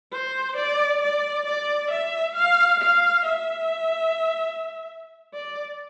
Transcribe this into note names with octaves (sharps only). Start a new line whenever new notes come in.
C5
D5
D5
D5
E5
F5
F5
E5
D5